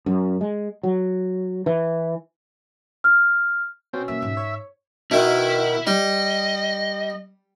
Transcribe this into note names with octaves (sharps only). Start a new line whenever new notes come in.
F#2
G#3
F#3
E3
F6
B2 C4 C#4
A#3 E5
G#2
C#5
B2 D#3 E4
G3 D#5